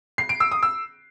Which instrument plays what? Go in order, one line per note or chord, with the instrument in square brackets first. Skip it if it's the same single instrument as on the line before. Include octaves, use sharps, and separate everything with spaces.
[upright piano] C7
D7
E6
D#6
E6